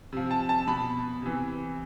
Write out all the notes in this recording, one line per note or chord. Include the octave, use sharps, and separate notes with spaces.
C3 F3
A5
A5
B2 B5
C3 E3